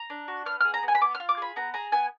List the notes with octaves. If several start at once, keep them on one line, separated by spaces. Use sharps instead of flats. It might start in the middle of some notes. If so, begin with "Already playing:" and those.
Already playing: A#5
D4
F#4
B3 F6
G#4 F6
A#5
B3
G#5
B5
B3 D6
F6
F4
D6
G#4 B5
B3 A#5
G#4 A#5
B3 G#5